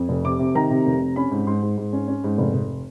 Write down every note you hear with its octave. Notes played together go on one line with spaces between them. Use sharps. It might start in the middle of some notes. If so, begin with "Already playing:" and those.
Already playing: F2
F1
C3 D6
C3
D#3 A#5
C3
F1
C3
C#4 B5
G#2
G#2 C6
G#2
G#2
C#4
C#4
G#2
F1
F1